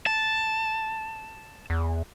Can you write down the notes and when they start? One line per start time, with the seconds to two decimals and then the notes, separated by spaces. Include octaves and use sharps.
0.06 A5
1.70 E2